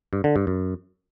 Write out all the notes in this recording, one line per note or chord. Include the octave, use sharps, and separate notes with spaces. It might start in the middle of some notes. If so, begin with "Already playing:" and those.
G2
D3
G2
F#2